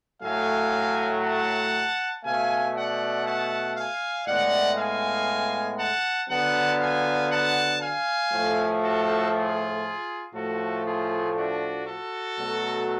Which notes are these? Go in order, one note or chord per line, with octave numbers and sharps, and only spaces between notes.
A2 F#3 A3 F5 G#5
F#5 A5
B2 A3 F5 G#5
D5 F#5
F#5 A5
F5 G#5
A2 G#3 B3 D5 F#5
F5 G#5
F#5 A5
D3 F#3 B3 F#5 A5
F5 G#5
F#5 A5
F5 G#5
A2 F3 A3
F#4 A4
F4 G#4
A2 F3 A3 F#4 A4
F4 G#4
D4 F#4
F#4 A4
B2 F#3 A3